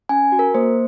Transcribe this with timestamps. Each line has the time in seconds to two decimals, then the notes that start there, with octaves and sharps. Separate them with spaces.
0.09 C#4 G#5
0.32 F#4
0.39 A#4
0.54 A#3 C5